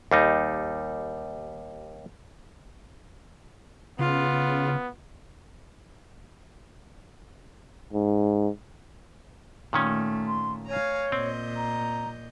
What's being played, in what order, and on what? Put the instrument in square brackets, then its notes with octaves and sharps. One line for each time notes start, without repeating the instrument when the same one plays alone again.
[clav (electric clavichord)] D#2 G3 D#4
[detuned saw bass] C#3 [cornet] B3 [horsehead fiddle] F4
[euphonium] G#2
[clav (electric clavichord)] A#2 D#3 C#4 [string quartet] A3
[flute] C6
[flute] C#5 [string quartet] F5 G#5 A#5
[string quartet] A#2 D#5 G6 [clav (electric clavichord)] C4
[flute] A#5